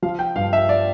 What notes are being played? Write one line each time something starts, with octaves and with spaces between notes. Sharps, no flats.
F3 F5
G5
G2 F5
E5
D5